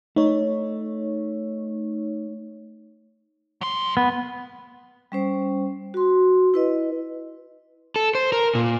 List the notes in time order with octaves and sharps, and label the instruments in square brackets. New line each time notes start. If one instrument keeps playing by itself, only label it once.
[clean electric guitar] A3 [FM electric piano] D#4 C#5
[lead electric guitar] F#3 C6
[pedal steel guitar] B3
[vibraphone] G3 C#4 C5
F#4 C6
E4 B4 D#5
[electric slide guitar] A4
C5
A#4
A#2